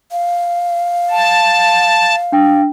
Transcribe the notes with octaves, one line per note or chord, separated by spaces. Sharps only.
F5
A5
D4 G5